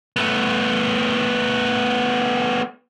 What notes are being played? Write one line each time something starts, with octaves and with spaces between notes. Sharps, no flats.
A3 B3